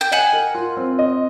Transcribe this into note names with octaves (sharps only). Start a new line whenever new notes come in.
G5
D#5 F#5 G#5
A#4
F4
C4
D#5